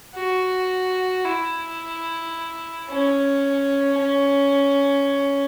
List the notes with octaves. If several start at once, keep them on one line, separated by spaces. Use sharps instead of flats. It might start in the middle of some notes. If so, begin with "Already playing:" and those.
F#4
E4
C#4
C#4